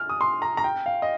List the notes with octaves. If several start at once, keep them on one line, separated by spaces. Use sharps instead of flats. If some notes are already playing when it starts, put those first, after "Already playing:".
Already playing: F6
D#6
C6
A#5
A#5
G5
F5
D#5